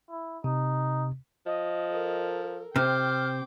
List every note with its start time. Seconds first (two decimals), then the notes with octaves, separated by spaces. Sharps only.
0.10 E4
0.44 C3 D#4
1.46 F3 D#5
1.89 A4 A#4
2.76 C3 C5 G5 D6 F6